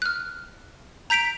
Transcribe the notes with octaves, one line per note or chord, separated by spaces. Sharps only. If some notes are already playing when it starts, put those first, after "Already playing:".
F6 F#6
A#5 G6 B6 D7 F7